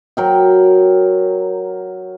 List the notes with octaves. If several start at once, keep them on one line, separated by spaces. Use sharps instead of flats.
F#3 A#4 G5